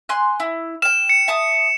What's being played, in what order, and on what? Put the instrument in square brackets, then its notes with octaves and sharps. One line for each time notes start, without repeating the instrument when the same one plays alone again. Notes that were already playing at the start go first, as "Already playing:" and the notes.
[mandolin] G#5 C6 F#6
E4
[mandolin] G5 F6 [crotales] E7
[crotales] C#7
[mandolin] E5 A5 D#6